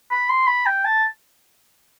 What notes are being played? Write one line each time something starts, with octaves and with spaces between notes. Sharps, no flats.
B5
C6
B5
G5
A5